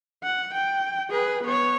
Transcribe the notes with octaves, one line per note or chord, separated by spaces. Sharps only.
F#5
G5
G#4 B4
B3 C#5